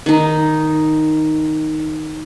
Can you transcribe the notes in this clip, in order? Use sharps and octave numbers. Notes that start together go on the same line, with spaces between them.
D#3 D#4